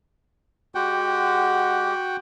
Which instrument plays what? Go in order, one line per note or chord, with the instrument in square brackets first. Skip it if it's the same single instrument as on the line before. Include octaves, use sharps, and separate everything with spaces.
[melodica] G#3 G4 [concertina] F#4 F#5 G5